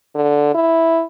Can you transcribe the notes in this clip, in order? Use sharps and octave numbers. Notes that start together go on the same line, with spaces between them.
D3
E4